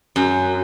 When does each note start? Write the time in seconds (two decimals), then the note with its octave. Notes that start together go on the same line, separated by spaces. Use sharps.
0.16 F#2